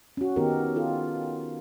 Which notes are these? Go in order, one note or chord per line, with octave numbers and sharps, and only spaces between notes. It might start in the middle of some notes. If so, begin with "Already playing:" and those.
C#4 F#4
D#3 B3 D#4 G4 A#4
F4 A4